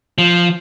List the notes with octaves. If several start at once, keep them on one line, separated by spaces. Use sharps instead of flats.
F3